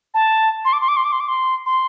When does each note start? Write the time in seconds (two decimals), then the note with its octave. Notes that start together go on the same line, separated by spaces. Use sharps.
0.14 A5
0.65 C6
0.73 D6
0.81 C6
0.88 D6
0.97 C6
1.04 D6
1.12 C6
1.20 D6
1.28 C6
1.66 C6